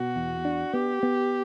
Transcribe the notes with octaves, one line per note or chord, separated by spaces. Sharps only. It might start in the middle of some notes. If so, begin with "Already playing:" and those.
Already playing: B2 F#4
E2
D4
B3 G4
B3